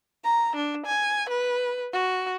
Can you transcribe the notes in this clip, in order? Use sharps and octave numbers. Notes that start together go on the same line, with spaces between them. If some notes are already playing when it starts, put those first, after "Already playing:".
A#5
D4
G#5
B4
F#4